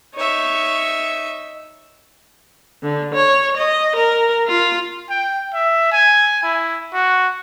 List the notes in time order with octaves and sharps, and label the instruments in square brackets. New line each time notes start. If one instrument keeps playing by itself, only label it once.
[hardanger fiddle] D#4 E5 [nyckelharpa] C#5
[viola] D3
C#5
D#5
A#4
F4
[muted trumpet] G5
E5
G#5
E4
F#4